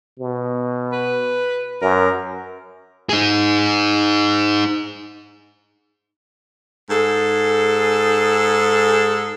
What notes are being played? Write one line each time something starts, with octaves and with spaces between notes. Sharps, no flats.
B2
B4
F#2 A#4
D#4 G#4
G#2 G#4 A4